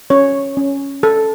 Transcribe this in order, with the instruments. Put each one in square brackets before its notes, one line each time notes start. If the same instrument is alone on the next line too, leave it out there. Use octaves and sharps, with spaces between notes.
[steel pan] C#4 C#5
C#4
A4